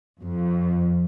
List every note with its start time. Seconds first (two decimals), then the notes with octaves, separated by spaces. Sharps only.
0.22 F2